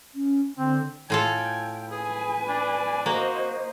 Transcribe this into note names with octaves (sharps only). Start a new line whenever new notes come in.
C#4
D3 C4
A2 F4 A4 G5 G#5
G#4 B4 G#5
D4
A#3 F#4 C5 D#5